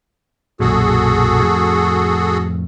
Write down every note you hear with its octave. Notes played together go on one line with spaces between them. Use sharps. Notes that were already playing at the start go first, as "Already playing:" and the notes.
B1 F#2 A#2 F#4 G#4 A4
F2 A2